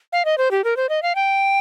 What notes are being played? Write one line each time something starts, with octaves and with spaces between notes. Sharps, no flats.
F5
D#5
C5
G4
A#4
C5
D#5
F5
G5